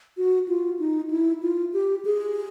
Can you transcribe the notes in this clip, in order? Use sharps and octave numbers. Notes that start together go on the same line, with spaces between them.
F#4
F4
D#4
E4
F4
G4
G#4